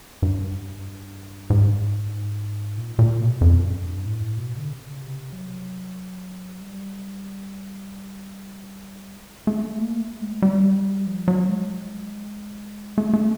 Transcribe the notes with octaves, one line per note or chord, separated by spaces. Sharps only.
G2
G#2
A#2
A#2
B2
F2
F#2
G2
A2
B2
D3
C#3
C3
F#3
G3
G#3
A3
A#3
A3
G#3
G3
F3
F#3
G#3
A3
A3